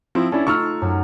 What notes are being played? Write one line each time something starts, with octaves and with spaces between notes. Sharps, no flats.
F3 C4 E4
C#4 D4 E4 A4
A3 D#4 F4 C#6 E6 F6
F#2